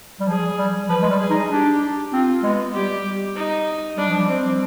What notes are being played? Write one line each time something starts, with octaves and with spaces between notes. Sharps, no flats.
G3
F3 G#4
G3
F3 B4
G#3
G3
G#4
D#4
D4 G4
C4 F4
G#3 B3
G3 G4
D#4
G3 D4
F3
G3
C4